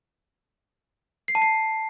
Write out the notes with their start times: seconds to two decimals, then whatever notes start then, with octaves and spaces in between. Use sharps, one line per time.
1.28 C7
1.35 A5
1.42 C7